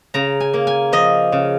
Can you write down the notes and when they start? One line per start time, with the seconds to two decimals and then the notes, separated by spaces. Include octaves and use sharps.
0.14 C#3 A#5
0.40 G#5
0.54 A#3
0.67 G#5
0.92 F3 D#5
1.32 C#3